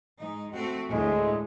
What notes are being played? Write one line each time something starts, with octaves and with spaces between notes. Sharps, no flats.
G#2 D#4
A3 C4 F#4
D2 A2 G#3